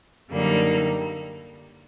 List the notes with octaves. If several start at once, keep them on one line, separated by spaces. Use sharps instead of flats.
F#2 D3 G3 A#3 D#4